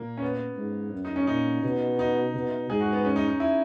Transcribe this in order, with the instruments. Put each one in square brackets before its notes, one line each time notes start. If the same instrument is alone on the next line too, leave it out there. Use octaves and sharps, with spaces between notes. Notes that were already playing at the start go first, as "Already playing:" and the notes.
Already playing: [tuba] A#2 [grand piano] A#3
[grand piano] C#4
B3
[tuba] G#2
F#2
[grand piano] D#4
C#4
[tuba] A#2 [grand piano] D#4
[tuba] B2
[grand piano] D#4
[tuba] B2
[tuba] G#2 [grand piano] G#4
[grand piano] F#4
B3
C#4
D#4
D#4
E4